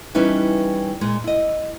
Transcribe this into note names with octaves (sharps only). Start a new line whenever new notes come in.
E3 G3 C#4 D#4 E4 B4
A#2 G#3
E4 D#5